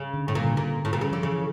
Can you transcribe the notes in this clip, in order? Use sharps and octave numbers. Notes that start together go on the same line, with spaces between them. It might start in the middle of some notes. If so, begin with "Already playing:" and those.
Already playing: C#3
D3
A2
A#2 C#3
D3
A#2 C#3
A2
A#2
C#3
D3 F3
C#3 E3